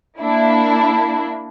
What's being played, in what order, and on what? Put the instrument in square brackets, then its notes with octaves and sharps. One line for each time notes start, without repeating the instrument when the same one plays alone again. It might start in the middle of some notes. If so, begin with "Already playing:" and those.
[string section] A#3 D4 E4